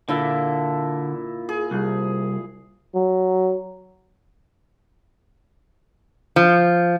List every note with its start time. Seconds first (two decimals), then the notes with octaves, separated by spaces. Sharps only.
0.09 A#2 D3 E4 E5
1.49 G#4
1.71 C2
2.95 F#3
6.36 F3